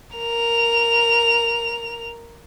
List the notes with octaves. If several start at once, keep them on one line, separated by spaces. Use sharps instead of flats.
A#4 F7